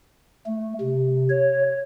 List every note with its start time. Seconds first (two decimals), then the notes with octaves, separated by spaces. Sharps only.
0.46 A3
0.81 C3
1.29 C#5